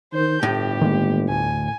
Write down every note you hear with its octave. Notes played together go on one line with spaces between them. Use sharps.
D#3 C5 G6
G1 A2 G4
D#3 G#3 A#3
D2 G#5